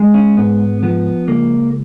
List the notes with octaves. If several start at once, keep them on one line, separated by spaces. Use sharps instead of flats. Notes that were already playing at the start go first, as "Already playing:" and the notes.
Already playing: G#3
C#4
G#2 B3
F3 B3
C#2 A#3